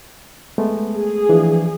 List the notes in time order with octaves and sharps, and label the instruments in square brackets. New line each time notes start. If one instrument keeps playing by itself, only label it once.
[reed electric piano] G#3 A3 B3
[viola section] G#4
[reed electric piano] E3 F3 D4